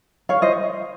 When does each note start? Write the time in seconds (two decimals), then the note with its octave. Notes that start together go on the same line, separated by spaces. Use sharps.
0.29 C#5 F5
0.42 C5 D#5